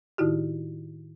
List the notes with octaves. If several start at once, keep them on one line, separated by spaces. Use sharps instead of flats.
A2 D#3 D#4 E4 F#4 G4